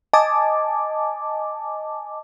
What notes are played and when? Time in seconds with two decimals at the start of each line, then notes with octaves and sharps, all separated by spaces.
0.13 D#5 G#5 A5 D6